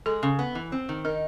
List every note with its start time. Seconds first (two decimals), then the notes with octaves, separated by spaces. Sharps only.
0.06 G#3 A4
0.23 C#3
0.39 B3
0.55 E3
0.72 C4
0.89 D#3
1.05 D#4 A#4